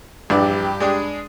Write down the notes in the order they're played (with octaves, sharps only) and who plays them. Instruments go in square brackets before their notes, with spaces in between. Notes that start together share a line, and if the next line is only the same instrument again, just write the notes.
[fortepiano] A#1 E3 D5 [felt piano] G2 [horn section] G4
[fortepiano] G#3 D4 G#4